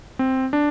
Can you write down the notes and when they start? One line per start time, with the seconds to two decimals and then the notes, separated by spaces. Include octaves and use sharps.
0.19 C4
0.53 D4